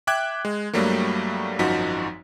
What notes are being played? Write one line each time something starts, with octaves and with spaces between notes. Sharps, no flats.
E5 G5 D6 F#6 G#6
G#3
G2 F#3 G3 A3 A#3
G#1 F#2 F3 D#4 F#4 B6